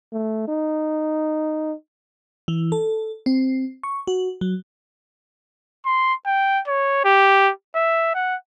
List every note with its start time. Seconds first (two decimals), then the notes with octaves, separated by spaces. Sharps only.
0.12 A3
0.48 D#4
2.48 E3
2.72 A4
3.26 C4
3.83 C#6
4.07 F#4
4.41 F#3
5.86 C6
6.26 G5
6.68 C#5
7.04 G4
7.75 E5
8.15 F#5